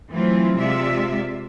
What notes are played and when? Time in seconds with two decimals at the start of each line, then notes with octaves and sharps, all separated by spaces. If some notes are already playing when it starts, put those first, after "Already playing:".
0.10 E3 F#3 A3 C4 F4
0.56 C3 G#3 F4 D5 E5